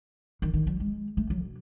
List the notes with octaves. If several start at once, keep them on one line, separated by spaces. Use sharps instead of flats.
D#3
D#3
F#3
G#3
A3
F#3
B2